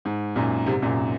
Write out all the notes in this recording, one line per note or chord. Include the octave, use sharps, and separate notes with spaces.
G#2
F#2 A#2
G#2 C3
F#2 A#2